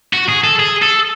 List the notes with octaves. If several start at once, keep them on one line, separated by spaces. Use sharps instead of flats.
F#4
G#4
A4
G#4
A4